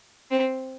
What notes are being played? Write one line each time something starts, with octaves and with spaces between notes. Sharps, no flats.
C4